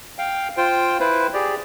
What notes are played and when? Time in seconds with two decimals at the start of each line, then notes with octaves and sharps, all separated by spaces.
0.18 F5 G5
0.57 F4 C5 G5
1.00 E4 B4 C5
1.34 G4 G#4 D5